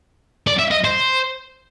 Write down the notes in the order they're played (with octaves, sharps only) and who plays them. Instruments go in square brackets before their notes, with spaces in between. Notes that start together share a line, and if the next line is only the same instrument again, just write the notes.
[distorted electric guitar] D5
E5
D#5
C5